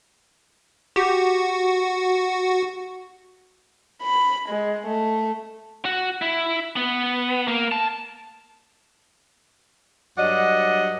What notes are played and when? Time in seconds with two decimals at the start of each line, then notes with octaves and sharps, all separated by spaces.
0.96 F#4 G4
4.02 B5
4.50 G#3
4.88 A3
5.85 F#4
6.22 E4
6.76 B3
7.48 A#3
7.72 A5
10.18 G2 F#3 D5 D#5 F#5